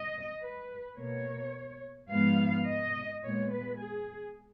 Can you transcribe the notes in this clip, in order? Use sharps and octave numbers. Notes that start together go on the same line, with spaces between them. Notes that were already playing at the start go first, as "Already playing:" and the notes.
Already playing: D#5
B4
B2 A#3 C#5
G#2 F3 B3 F5
D#5
A#2 G#3 B3 C#5
B4
G#4